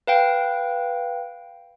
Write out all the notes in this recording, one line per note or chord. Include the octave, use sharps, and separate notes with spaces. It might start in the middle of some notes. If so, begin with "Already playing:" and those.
B4 F5 G5